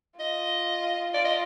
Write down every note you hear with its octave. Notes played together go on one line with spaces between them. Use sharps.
F4 D#5
F4 D5
D#5